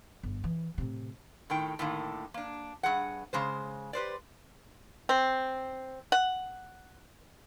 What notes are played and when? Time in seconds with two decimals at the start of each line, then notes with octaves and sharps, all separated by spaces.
0.23 G1
0.44 E3
0.78 A2 C3
1.50 A2 D#3 G5
1.79 A2 D3 D#3 A#3
2.34 A#3 D4
2.83 G2 E3 G#4 F#5
3.33 C#3 G#3 C5
3.93 G4 B4 C5 D5
5.09 C4
6.12 F#5